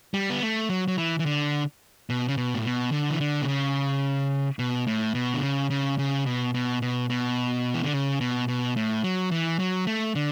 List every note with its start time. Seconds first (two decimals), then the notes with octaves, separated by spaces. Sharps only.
0.14 G3
0.30 B3
0.42 A3
0.69 F#3
0.88 F#3
0.98 E3
1.19 E3
1.26 D3
2.10 B2
2.28 C#3
2.37 B2
2.55 A2
2.65 B2
2.92 D3
3.10 E3
3.20 D3
3.42 B2
3.48 C#3
4.59 B2
4.87 A2
5.15 B2
5.34 D3
5.42 C#3
5.70 C#3
5.99 C#3
6.26 B2
6.54 B2
6.82 B2
7.10 B2
7.74 E3
7.83 D3
7.93 C#3
8.21 B2
8.48 B2
8.76 A2
9.04 F#3
9.31 E3
9.59 F#3
9.87 A3
10.15 D3